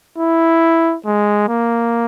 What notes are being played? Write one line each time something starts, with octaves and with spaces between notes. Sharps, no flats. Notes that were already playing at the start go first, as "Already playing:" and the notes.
E4
G#3
A#3